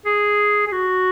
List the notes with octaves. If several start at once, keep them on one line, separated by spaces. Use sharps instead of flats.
G#4
G#4
F#4